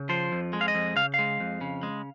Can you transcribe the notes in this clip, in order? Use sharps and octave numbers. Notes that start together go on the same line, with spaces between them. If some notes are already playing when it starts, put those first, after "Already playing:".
Already playing: C#3
F3 C5
F2
G#3
F5
D#5
F2
C#3 F5
G#3 F5
F2
C#3
G#3